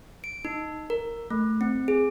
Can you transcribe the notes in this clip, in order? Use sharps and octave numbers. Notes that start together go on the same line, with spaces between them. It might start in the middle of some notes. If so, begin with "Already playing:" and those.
D7
D#4
A#4
A3
C4
G#4